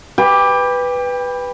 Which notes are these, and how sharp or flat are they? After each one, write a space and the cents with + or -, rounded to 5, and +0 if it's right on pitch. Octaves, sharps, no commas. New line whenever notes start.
G4 +0 B4 +0 G5 +30